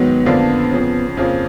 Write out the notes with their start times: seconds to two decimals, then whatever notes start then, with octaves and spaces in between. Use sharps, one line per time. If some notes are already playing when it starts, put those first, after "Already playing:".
Already playing: G#2 D#3 F#3 B3
0.26 F2 D3 F3 A#3 D4
0.71 F2 C#3 F3
1.17 F2 C#3 F3 A#3